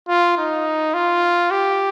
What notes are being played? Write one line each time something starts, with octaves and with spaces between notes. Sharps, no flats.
F4
D#4
F4
G4